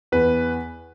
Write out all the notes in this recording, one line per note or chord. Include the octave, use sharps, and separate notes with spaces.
E2 B4